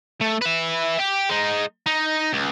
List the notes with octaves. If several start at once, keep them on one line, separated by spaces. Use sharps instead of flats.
A3
B4 E5
G4
G#3 D#4
D#4
C#2